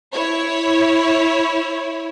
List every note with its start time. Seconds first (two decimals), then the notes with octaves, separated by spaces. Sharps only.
0.14 E4 C#5